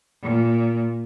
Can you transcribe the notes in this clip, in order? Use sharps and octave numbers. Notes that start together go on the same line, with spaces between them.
A#2